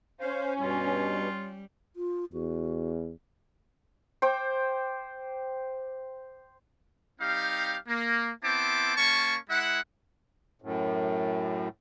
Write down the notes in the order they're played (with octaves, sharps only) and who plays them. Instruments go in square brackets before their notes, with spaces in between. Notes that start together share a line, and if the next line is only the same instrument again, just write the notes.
[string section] C#4 [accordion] C5 F5
[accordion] G2 B2 [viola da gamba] G3 [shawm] F4
[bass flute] F4
[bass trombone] E2 [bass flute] F#4
[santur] C5 G5 D6
[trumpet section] G3 C4 D#4 G4 F5
A#3
B3 C4 E4 C5 A5 D6
A#3 C#4 A5 C#6
G#3 E4 E5 F#5
[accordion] F#2 A2